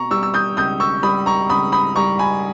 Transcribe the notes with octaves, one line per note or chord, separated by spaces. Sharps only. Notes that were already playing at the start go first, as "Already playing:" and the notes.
Already playing: B2 A#5 C#6
G3 C#6 E6
E6
D#6 G6
C#2 D#6 G6
C#6 E6
G3 B5 D#6
A#5 C#6
C#2 B5 D#6
B5 D#6
G3 A#5 C#6
G#5 B5